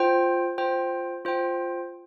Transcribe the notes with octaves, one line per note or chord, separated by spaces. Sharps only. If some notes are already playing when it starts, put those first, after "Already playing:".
Already playing: F4 C5 G5
F4 C5 G5
F4 C5 G5